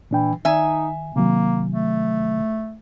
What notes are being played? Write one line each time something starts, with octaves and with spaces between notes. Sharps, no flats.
A#2 E3 D4 G5
D#3 D#4 E5 G#5
C3 D#3 F#3 A#3
A3